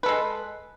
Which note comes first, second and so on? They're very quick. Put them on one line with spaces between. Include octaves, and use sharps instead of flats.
B4 A4 G#3